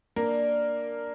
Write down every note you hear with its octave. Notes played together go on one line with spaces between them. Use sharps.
A#3 D4 A#4